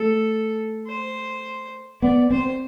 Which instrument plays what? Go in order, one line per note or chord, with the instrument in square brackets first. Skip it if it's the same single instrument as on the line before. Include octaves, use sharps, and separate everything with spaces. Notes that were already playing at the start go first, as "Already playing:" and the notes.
Already playing: [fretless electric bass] A3 [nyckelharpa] A4
[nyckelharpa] C5
[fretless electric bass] B3 [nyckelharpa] D5
[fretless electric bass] C4 [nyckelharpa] C5